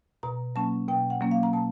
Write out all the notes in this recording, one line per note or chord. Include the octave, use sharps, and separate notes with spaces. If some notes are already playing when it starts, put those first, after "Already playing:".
B2 A#5
F#3 A#3 C#4 A5
B2 G5
F#5
F#3 A#3 C#4
F5
A#5
B2 A5